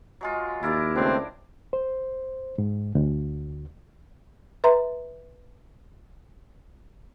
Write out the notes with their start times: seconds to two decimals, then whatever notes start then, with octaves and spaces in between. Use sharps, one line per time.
0.21 F#3 G#3 F4
0.63 D#2 E4 A#4 D5
0.95 C#2 A3 C4 D4
1.73 C5
2.58 G#2
2.95 D2
4.64 B4 E5 A#5 C6